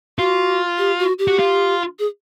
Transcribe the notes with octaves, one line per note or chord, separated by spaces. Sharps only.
F4 F#4
G4
F#4
G4
F#4
F4
G#4